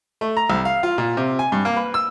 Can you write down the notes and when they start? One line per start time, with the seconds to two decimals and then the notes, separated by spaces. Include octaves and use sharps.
0.21 A3
0.37 A#5
0.50 C2
0.65 F5
0.83 F4
0.98 A#2
1.17 C3
1.39 G#5
1.52 G2
1.65 A#3
1.77 B4
1.94 E6